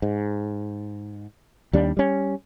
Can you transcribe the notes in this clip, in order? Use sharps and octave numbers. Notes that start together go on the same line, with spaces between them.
G#2
D#2 G3 D4
G3 C#4